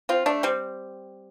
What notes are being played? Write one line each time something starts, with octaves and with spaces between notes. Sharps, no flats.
C4 F4
A3 D4
G3 C4